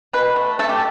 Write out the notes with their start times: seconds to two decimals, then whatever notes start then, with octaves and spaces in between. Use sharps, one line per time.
0.13 B2 B4
0.36 A3
0.59 A3 A4
0.69 G4